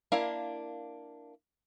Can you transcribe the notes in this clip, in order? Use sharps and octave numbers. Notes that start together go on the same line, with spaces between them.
A#3 D4 E4 A#4 F5